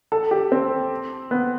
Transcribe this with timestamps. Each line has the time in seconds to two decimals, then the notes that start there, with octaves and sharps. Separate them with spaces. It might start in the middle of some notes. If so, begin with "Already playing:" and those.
0.12 A4
0.31 G4
0.52 C4
1.31 B3